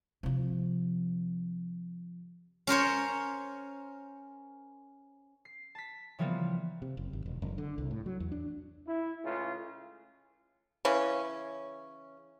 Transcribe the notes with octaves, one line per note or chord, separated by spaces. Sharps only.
C3 F3
C#4 A#4 C5 C#5
C7
A5 B6
C#3 E3 F3 G3 A#3 B3
C3
F#1
G#1
E1
F#1
D3
C2
A2
F#3
E2
D4
E4
C#2 A2 C#3 F4
C#3 E3 C#4